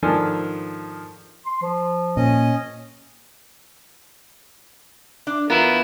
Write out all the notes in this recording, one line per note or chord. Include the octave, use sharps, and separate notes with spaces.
G#2 D#3 F3 D4 A4 G#5
C6
F3
A#2 C#4 D#5
D4
B3 E4 F4 A#4